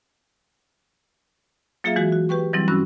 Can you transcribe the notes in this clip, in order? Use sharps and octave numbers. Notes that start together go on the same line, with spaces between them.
F#3 A#3 F4 G#4 E5 F5
E3 G#3 F#4 G#4
F#4
G4 B4 G5 C#6
E3 F#3 G3 C4 E4
G2 C#4 F#4 E6 F#6